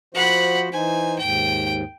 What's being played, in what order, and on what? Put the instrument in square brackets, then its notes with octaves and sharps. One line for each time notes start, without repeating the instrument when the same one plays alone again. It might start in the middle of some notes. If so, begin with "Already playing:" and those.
[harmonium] F3 F#4 C5 [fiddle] F#5 B5
[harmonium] E3 D#4 C5 [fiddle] G#5
[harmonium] D#2 G#2 [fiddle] G5